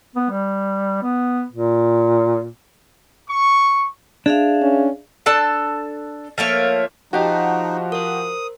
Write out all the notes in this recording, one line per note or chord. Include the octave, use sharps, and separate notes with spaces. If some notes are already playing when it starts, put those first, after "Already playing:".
B3
G3
B3
A#2
C#6
D4 G#4 E5 F5
C#4
D4 A4 A5
F3 A3 A#3 C#5
F3 D#4 F#4 G4 D#5 F#5 A5
A#4 C5 D#6